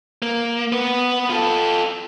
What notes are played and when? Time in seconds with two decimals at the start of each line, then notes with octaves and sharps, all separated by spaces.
0.22 A#3
0.72 B3 B4
1.30 F4 A4